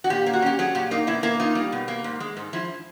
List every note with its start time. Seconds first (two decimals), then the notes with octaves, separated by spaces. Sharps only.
0.04 F#4
0.10 A#2 G4
0.26 A#3
0.33 F#4
0.42 C#4 G4
0.59 F#3 G#4
0.75 A#2 G4
0.91 A#3 D#4
1.07 B2 E4
1.23 A#3 E4
1.40 D#4 F4
1.55 G3
1.72 B2
1.88 A#3
2.04 G#2
2.20 G#3
2.37 G#2
2.53 F3 E4